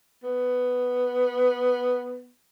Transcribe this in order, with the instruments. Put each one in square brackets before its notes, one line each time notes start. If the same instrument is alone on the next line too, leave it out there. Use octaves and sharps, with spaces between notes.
[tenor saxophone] B3